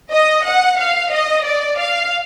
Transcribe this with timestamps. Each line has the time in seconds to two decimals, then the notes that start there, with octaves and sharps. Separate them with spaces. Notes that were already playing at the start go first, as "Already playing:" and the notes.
0.12 D#5
0.46 F#5
0.79 F5
1.12 D#5
1.46 D5
1.79 F5